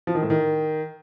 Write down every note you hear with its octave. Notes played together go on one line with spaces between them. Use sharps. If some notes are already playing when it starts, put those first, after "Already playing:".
F3
D#3
A2
D#3